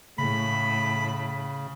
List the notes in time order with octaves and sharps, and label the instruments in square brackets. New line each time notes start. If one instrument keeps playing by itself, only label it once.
[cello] A2 [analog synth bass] C#3 [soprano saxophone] B5